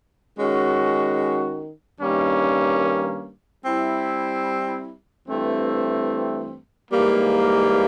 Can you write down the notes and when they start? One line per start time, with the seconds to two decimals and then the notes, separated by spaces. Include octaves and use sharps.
0.37 D#3 G#3 C#4 F#4
2.00 G2 D#3 G3 A#3 C#4
3.64 G3 C4 E4
5.27 G2 E3 A3 C4
6.91 G#2 E3 G3 A#3